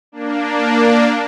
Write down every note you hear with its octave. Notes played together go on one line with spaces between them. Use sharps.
A#3 D4